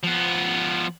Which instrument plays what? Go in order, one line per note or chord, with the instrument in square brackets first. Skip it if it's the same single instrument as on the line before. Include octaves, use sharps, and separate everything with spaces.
[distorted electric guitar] F3 B3